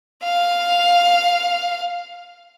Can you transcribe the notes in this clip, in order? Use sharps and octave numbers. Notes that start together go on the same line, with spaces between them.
F5